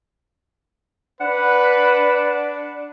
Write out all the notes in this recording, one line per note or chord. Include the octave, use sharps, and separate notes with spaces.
D4 B4 F#5